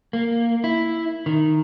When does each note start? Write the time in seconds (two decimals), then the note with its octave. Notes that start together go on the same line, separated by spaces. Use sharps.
0.13 A#3
0.64 E4
1.26 D#3